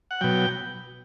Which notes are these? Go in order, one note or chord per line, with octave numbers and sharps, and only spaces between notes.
F#5
B2 F#3 G5